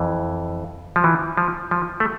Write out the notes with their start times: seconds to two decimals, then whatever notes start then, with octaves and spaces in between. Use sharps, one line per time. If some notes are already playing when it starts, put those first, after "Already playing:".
Already playing: F2 E3
0.96 F3
1.04 E3
1.37 F3
1.71 F3
2.00 A3